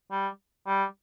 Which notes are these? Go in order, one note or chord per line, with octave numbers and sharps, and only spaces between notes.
G3
G3